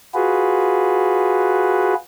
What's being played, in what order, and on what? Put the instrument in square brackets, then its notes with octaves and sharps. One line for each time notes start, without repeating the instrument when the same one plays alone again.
[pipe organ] F4 F#4 G#4 B4